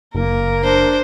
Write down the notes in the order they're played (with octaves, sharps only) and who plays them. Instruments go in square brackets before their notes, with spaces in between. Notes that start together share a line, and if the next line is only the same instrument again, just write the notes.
[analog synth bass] F#1 [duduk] A#3 [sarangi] A#4
[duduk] D4 [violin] C5